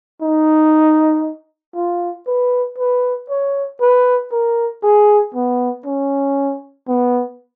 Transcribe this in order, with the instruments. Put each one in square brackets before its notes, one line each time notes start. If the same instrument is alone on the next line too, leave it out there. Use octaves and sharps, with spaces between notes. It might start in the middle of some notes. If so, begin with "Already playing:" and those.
[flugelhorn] D#4
F4
B4
B4
C#5
B4
A#4
G#4
B3
C#4
B3